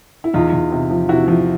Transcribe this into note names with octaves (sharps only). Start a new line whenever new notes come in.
E4
E2 D#4 F4
E2
C3
F3
C3 E4 F#4
F3